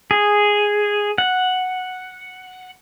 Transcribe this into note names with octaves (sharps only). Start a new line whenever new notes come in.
G#4
F#5